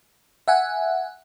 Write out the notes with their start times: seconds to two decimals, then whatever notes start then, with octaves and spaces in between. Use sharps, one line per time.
0.48 E5 F#5 G#5